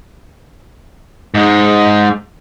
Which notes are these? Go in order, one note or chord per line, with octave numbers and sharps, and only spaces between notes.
G#2 G#3